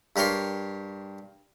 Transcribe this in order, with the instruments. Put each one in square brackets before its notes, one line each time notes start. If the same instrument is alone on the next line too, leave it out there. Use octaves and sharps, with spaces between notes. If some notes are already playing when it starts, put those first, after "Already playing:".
[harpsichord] G2 G4 A#4 C#5 C6